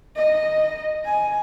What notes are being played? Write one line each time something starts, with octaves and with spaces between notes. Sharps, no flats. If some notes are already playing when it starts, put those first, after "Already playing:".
D#5
G#5